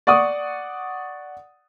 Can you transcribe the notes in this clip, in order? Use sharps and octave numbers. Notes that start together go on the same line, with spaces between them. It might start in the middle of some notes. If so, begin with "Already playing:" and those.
D5 F#5 C#6 D#6